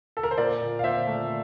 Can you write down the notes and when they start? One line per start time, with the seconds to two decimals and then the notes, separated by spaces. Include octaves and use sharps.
0.17 A4
0.23 A#4
0.31 C5
0.38 A#2 A#4 D5
0.61 A#2
0.79 F5
0.84 A#2 C5 E5
1.07 A3